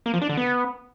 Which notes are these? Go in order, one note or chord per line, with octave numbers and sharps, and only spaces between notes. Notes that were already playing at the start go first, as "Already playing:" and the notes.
A#3
F3
D4
D3
B3